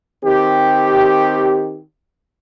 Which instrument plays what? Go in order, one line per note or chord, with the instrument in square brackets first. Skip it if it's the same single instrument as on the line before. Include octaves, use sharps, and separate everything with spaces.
[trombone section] D#3 C4 G4